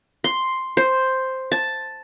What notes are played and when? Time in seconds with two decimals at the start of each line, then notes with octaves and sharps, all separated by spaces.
0.24 C6
0.77 C5
1.52 A5